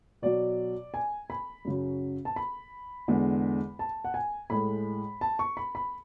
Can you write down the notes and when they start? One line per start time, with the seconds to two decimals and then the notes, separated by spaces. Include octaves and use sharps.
0.22 B2 F#3 D5
0.94 G#5
1.30 B5
1.65 F#2 C#3 F#3
2.25 A5
2.36 B5
3.08 E2 D3 G#3
3.79 A5
4.04 F#5
4.14 G#5
4.50 A2 G#3 B5
5.21 A5
5.39 C#6
5.57 B5
5.75 B5